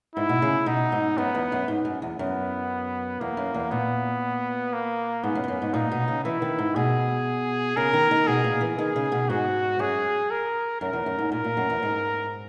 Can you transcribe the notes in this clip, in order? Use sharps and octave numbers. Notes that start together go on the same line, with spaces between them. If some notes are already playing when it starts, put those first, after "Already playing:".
G#2 E4
B2
C#3
B2 D#4
G#2
F#2 B3
E2
F#2
G#2
F#2
E2
F#2 B3
E2 A#3
F#2
E2
A#2 B3
A#3
G#2 B3
F#2
G#2
F#2
G#2
A#2 D#4
B2
C#3
E3 E4
D#3
G#2
B2 G#4
C#3 A#4
D#3
D#3
B2 G#4
A#2
E3
D#3 G#4
C#3
B2
G#2 F#4
F#2 G#4
A#4
F#2 A#4
E2
F#2
G#2
A#2 A#4
A#2
F#2
E2
G#2